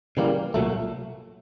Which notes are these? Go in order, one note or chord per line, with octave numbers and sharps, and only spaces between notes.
C#3 E3 G3 A#3
C2 A#2 F#3 A3